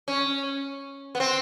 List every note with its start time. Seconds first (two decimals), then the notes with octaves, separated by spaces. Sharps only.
0.08 C#4
1.15 B3
1.20 C4